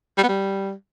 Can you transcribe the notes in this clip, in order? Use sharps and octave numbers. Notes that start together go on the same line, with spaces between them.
G3
B3
G3